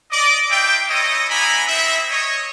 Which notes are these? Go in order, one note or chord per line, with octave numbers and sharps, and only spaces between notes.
D5 D#5 D6
D#4 F4 E5 G5
E4 A4 C#5 D#5
B3 D4 E4 G#5 A#5 B5
C4 D#4 E4 E5
C#5 D#5